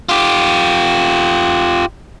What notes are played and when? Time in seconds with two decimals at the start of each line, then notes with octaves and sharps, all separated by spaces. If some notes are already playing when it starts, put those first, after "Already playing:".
0.09 F4 G4